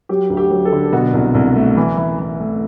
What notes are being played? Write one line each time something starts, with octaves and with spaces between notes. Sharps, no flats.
F#3 G4
D2
G4
F#3
A4
D3
B2 F#4
C2
C2
A3
E3
E3
E3
A3